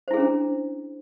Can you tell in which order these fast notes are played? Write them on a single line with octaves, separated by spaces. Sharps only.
C5 E4 G#4 C#4 D4